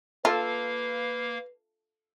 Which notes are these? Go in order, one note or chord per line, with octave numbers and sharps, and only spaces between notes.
A#3 F4 A4 B4 F5